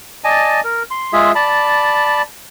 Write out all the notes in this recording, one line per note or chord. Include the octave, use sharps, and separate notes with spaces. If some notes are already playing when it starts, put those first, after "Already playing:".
D5 D#5 G#5 A5
A#4
C6
G#3 F4 G#4 E5
D5 A5 B5